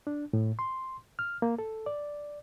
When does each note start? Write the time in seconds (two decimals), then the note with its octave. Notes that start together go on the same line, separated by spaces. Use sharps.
0.07 D4
0.33 A2
0.59 C6
1.19 F6
1.42 A#3
1.59 A4
1.86 D5